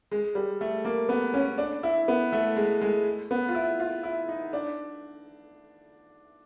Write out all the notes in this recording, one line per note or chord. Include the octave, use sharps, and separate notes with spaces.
G#3
G3
A3
A#3
B3
C#4
D4
E4
B3
A3
G#3
G#3
B3
F4
E4
F4
E4
D#4
D4